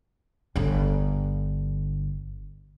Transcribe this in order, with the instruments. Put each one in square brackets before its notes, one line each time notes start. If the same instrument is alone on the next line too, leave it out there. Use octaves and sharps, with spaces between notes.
[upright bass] G1 D3